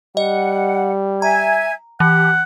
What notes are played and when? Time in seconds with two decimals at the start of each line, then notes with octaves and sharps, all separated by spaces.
0.17 G3 D#5 F#5
1.22 E5 G#5 A#5 G#6
2.00 E3 G4 F#5